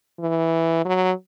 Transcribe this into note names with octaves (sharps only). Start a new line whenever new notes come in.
E3
F#3